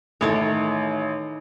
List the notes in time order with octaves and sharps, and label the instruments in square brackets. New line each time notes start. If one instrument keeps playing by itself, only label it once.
[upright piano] A1 E4 [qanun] D#3 A4 C#5